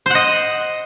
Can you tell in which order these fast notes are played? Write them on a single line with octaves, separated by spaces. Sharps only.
C5 F#5 D#5